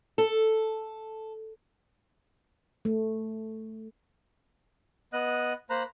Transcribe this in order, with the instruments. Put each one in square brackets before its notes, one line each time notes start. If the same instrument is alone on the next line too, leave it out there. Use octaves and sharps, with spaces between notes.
[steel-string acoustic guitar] A4
[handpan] A3
[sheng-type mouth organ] B3 D#5 F#6
A#3 C5 A#5 B5 F#6